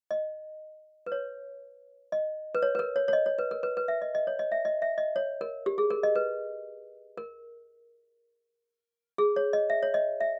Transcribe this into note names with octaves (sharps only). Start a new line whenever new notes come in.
D#5
B4
C#5
D#5
B4
C#5
B4
A#4
C#5
C#5
D#5
C#5
B4
A#4
B4
B4
E5
D#5
D#5
C#5
D#5
E5
D#5
E5
D#5
C#5
A#4
G4
G#4
A#4
D#5
B4
A#4
G#4
C#5
D#5
E5
C#5
D#5
E5